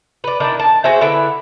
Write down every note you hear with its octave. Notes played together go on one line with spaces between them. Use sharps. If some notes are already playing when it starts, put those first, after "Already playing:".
B4 D5
D#3 D4 E4 D5
A5
F#4 G#4 C5 E5
D3 E4 B4 E5